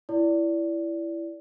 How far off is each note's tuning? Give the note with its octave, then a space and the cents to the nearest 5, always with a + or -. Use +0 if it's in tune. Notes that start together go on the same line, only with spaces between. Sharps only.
E4 +15 A#4 +0 D5 -20